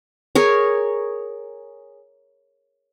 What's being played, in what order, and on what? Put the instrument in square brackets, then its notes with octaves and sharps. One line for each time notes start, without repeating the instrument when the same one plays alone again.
[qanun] G#4 A#4 C#5